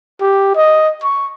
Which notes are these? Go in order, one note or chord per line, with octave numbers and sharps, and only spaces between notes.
G4
D#5
C#6